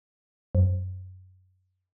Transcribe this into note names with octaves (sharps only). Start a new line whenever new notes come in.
F#2